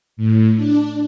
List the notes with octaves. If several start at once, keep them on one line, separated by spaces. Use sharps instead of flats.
A2
D4